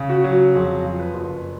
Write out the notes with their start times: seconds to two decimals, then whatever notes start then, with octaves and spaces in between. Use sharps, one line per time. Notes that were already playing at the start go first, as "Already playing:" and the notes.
Already playing: C#3
0.09 F#4
0.24 F#3
0.32 F#4
0.55 F2 G#4
0.85 F3
1.00 B4
1.14 F#1